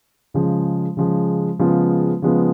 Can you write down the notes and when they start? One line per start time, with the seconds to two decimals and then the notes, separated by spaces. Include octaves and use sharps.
0.34 C#3 F3 G#3
0.97 C#3 F3 G#3
1.59 C#3 F3 G#3 B3 F4
2.22 C#3 F3 G#3 B3 F4